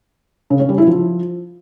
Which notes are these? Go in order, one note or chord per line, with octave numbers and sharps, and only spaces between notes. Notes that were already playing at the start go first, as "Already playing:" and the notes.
C#3
C#4
G3
E4
F3